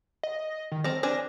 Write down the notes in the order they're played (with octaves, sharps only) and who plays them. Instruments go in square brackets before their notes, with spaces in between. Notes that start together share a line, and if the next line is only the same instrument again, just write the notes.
[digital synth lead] D#5
D#3
[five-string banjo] C4 A4 A#4 [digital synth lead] A#6
[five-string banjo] C4 D4 G#5 [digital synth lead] A#6